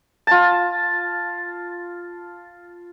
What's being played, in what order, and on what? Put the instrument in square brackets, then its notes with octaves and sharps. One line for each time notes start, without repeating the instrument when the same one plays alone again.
[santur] F4 A5